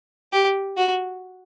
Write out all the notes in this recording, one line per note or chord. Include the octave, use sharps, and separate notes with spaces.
G4
F#4